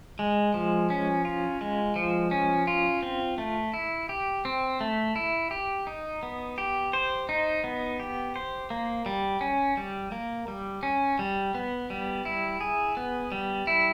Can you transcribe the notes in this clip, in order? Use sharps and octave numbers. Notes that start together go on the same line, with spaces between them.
G#3
F3
C#4
F4
G#3
F3
C#4
F4
C4
A3
E4
G4
C4
A3
E4
G4
D#4
B3
G4
C5
D#4
B3
G4
C5
A#3
G3
C#4
G3
A#3
G3
C#4
G3
B3
G3
E4
G#4
B3
G3
E4